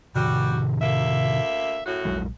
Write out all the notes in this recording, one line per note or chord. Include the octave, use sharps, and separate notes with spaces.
A2 C3 D#3 G3 F#4
D2 A#3 E5
F#2 A2 F#4
A#1 F#3 G#3